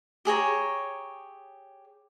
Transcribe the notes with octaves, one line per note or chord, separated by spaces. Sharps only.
G4 G#4 C#5 A#5